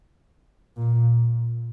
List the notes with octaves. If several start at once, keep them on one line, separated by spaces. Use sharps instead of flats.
A#2